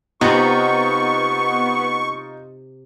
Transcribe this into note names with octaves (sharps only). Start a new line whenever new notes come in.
C3 B3 D#4 F4 C#6